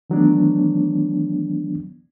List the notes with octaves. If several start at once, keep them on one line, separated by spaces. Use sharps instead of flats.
D#3 E3 F#3 A3 B3 D4